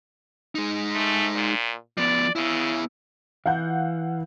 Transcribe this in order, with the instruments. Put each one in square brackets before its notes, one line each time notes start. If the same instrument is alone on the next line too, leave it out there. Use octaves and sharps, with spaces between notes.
[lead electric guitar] G#3 D#4
[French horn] A3
A#2
[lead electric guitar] F3 B3 [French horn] D5
[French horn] C#3 [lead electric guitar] B3 E4
[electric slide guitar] E3 [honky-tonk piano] F5 F#5 G6